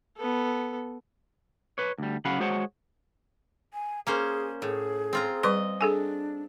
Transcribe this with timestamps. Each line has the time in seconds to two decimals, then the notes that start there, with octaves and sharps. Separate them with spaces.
0.17 B3 A4
1.78 B4 C#5
1.98 D2 G3
2.25 C#3 F#3 C#4 F5 F#5 B5
2.40 G#3 F#4 G#4 C5 C#5 F#5
3.74 G#5
4.07 A#3 C#4 G#4 C5
4.62 A2 G#4
5.13 C4 F4 A#5
5.43 G3 B4 D#5 C6
5.81 D4 G#4 A4 G#5